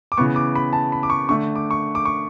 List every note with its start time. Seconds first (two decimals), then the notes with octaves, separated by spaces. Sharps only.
0.12 D6
0.17 C#3 E3 B3 C#6
0.36 D6
0.55 B5
0.73 A5
0.92 B5
1.03 D6
1.10 C#6
1.29 D3 A3 C#6
1.56 D6
1.71 C#6
1.95 D6
2.05 C#6